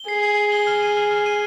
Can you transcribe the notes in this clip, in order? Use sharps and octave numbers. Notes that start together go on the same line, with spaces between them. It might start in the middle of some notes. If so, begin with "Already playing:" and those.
Already playing: G7
G#4 C7
C7
G7
G7
F6
D#7
F6
F6
D#7